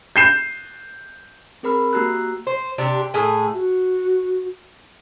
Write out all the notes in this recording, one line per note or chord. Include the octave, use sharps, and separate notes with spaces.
G6 C7 E7
C4 G#4 A#4 B5 F6
A#3 F#4 G4 A#5 E6 F#6
C5
C3 D4 G4
A2 G#4
F#4